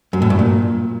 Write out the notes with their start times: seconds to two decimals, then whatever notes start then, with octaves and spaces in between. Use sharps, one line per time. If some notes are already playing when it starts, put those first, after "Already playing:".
0.13 F#2
0.22 A2
0.30 G2
0.39 A#2